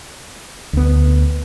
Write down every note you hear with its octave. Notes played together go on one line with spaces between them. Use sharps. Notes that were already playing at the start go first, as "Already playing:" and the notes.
D2 B3